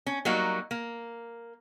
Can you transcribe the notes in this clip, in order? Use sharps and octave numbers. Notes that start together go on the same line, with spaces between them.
C#4
F#3 G3 A#3 D#4 F#4
A#3